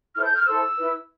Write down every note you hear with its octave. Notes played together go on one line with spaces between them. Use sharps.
E4 A4 C5 F6
G6
F6
E4 A4 C5 E6
E4 B4